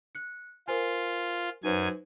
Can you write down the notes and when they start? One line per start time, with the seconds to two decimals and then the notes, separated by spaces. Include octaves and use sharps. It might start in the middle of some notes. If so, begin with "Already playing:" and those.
0.15 F#6 C#7
0.68 F4 A#4 C5 G#5
1.63 F#2 D#4 B4 C5 G#5